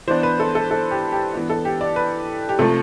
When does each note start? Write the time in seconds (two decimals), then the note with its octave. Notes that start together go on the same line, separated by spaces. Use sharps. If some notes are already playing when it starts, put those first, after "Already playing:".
0.08 E3 B3 D4 C5
0.23 B4
0.40 A4
0.55 A4
0.71 A4
0.91 G4
1.12 G4
1.33 E3 B3 D4
1.50 A4
1.65 G4
1.81 D5
1.96 B4
2.49 G4
2.59 C3 F3 A3 A4